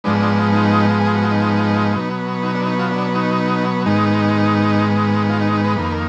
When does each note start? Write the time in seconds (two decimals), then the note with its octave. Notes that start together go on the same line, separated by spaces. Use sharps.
0.04 G#2 F3 G#3 B3 D4
0.52 D#4
1.00 G#4
1.15 F#4
1.31 D#4
1.95 B2 F#3 B3
2.43 D#4
2.55 D4
2.66 D#4
2.79 F4
2.91 D4
3.15 D#4
3.85 G#2 D#3 G#3 B3 D#4
5.29 F4
5.41 D#4
5.53 D#4
5.64 B4
5.77 F2 D#3 A#3 B4